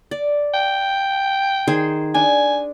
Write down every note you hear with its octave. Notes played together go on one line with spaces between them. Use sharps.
D5
G5
D#3 G#4 C5
D4 G#5